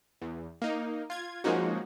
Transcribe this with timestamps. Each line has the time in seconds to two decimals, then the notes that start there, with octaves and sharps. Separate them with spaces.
0.22 E2
0.62 A#3 D#4
1.10 F4 G#6
1.44 F3 G#3 A#3 C#4 D#4 F#4